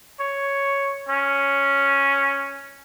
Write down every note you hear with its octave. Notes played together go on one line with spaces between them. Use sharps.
C#5
C#4